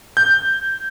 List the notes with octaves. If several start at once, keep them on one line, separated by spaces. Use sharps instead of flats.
G6